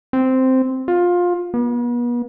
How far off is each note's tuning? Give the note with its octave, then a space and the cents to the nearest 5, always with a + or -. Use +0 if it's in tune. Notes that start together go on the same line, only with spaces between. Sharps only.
C4 -5
F4 +20
B3 -40